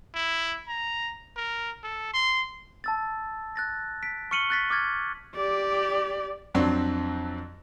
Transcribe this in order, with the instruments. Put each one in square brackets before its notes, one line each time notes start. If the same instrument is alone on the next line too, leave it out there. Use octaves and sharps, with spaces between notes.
[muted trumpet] E4
A#5
A#4
A4
C6
[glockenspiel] A5 E6 A6
F#6 A6 A#6
B6 D7
C#6 F6 C#7 D#7 F#7 G7
F#6 A6 B6
D6 F6 G#6 A6
[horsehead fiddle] G4 D5
[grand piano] F2 F#3 C4 D4